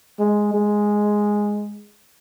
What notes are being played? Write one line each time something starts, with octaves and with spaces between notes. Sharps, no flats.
G#3
G#3